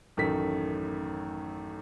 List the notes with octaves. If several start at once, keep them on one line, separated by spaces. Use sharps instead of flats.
A1 F#2 D#3 A3 B6